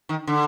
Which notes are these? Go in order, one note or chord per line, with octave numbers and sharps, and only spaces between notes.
D#3
D3